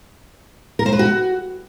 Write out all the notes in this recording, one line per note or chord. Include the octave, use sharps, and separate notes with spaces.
A#4
C5
B4
F#4